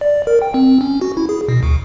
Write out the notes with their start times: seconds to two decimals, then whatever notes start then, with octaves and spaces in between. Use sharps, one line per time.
0.01 D5
0.27 A#4
0.42 G5
0.54 C4
0.81 C#4
1.01 F#4
1.17 E4
1.29 G#4
1.49 B2
1.63 D2